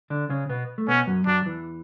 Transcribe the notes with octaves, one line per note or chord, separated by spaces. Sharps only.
D3 D4
C#3 C#4
B2 B3
A3
B2 B3 C#4
F#2 F#3
F#2 F#3 D4
E2 E3